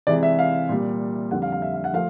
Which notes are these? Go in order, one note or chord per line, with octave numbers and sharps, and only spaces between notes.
C3 E3 G#3 D5
E5
F5
A#2 G3
F2 D3 G3 F#5
F5
F5
E5
F5
F#5
F3 A3 F5